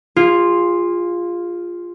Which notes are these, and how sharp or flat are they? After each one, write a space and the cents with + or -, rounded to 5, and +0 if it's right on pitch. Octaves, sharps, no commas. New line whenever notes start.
F4 +0 G#4 -30